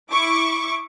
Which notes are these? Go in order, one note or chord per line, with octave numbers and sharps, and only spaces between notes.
E4 C#6 D6